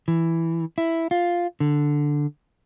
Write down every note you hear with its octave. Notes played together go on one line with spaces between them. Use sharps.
E3
E4
F4
D3